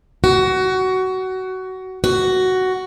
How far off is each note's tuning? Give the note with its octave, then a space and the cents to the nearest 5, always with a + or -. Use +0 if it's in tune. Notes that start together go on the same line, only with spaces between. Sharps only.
F#4 +20
F#4 +10